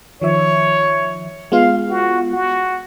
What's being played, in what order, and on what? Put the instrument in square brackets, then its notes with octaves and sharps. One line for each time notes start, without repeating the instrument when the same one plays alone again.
[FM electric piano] D#3 F3 E5 [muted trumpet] C#5
[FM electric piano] G#3 B3 F4 [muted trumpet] F5
[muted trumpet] F#4
F#4